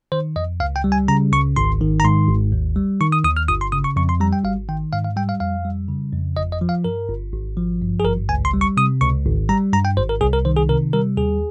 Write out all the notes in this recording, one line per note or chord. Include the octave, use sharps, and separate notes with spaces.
D#3 C5
F2 D#5
C#2 F5
G5
G3
G#5
C#3 A#5
C#2 C#6
G#1 C6
D#3
A#5
G#2 C6
G#1
D#2
G3
D#3 C#6
D#6
D#2 D#6
F6
G1 D#6
C6
C#3 D#6
C#6
F2 C#6
C6
G3 A#5
G5
G#1 F5
D#3 G5
G#2 F5
F5
G3 G5
F5
F2 F5
G3
C#3
F2
G1 D#5
D#5
F3
F5
G2 A#4
G1
G#1
F3
G2
G#4
G#1 A#4
C#2 G#5
C6
G3
C#6
C3 D#6
C#2 C#6
G#1
G3 A#5
G2 A#5
G5
G#1 C5
A#4
C2 G#4
A#4
D#3 C5
G#4
C3 A#4
G3 A#4
D#2 G#4